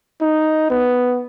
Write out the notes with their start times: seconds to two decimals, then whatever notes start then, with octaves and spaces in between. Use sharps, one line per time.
0.21 D#4
0.70 B3